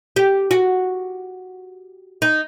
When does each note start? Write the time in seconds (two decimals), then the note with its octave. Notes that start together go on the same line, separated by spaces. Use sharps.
0.16 G4
0.51 F#4
2.22 D#4